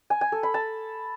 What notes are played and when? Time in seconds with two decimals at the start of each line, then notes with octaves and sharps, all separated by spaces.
0.10 G#5
0.21 G#5
0.32 A4
0.43 B5
0.54 A5